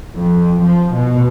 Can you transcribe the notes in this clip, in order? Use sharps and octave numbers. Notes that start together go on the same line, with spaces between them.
F2
F3
B2